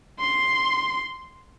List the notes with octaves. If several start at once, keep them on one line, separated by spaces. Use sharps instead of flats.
C6